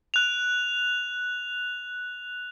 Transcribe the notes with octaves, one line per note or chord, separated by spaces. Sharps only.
F#6 F7